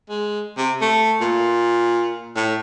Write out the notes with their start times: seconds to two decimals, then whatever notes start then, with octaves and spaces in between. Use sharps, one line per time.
0.10 G#3
0.57 C3
0.81 A3
1.21 A#2
2.36 A2